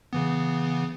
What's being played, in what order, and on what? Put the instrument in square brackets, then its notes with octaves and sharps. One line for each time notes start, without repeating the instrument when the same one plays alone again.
[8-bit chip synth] C#3 E3 B3